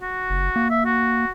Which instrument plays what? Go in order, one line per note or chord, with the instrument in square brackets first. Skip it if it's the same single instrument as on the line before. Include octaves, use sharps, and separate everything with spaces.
[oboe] F#4
[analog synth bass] F#1
A#3
[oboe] E5
F#4